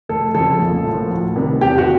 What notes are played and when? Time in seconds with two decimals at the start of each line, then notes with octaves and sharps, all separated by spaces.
0.09 F1 A4
0.34 F2 C#3 F3 A4
0.60 A#1
0.85 A2 F3 A#3
1.10 D2
1.36 C3 D#3 G3 B3
1.61 E2 G4
1.78 F#4